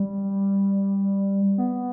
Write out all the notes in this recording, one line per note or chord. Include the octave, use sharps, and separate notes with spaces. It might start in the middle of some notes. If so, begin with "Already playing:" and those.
Already playing: G3
B3